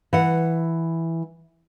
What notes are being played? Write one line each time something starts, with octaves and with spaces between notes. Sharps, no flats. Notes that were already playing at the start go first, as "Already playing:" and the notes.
E3 F#5